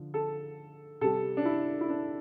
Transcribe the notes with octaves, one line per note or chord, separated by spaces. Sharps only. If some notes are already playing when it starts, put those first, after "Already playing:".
Already playing: D3 F3
A4
C3 G3 A4
D4
E4
E4
D4